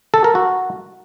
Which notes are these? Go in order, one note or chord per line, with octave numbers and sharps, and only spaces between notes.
A4
A#4
F#4